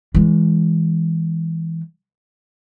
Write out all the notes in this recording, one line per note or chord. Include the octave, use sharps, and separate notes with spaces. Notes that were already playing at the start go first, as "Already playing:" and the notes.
E3 G#3